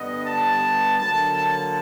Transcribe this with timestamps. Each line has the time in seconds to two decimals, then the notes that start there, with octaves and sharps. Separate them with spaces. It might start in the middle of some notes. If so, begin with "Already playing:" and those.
Already playing: G2 D3 G3 B3 D#5
0.25 A5
0.98 D3 F#3 A#3 A5
1.36 A5